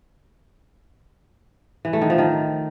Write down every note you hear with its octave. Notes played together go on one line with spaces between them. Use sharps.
E3
A3
D#3
F3
D#3